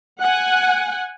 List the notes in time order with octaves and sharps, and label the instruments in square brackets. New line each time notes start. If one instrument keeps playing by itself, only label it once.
[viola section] F#5 G#5